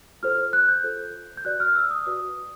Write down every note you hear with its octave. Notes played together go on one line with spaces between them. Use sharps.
F4 A4 C5 F6
F#6
G6
F4 A4 C5
G6
F#4 B4 D5 F#6
F6
E6
D#6
F#4 B4 D5 D#6